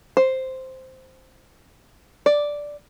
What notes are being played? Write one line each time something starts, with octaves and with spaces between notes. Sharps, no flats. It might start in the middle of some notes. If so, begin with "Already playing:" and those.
C5
D5